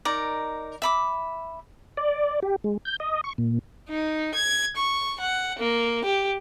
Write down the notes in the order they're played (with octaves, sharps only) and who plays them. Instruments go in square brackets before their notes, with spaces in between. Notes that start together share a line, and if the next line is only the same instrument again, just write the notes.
[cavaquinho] D#4 A#4 D5
E5 B5 D6
[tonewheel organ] D5
G4
G#3
G6
D#5
C#6
A#2
[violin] D#4
G#6
C#6
F#5
A#3
G4